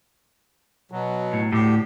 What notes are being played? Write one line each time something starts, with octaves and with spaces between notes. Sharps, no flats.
B2 F#3
A2
D2 A2 G4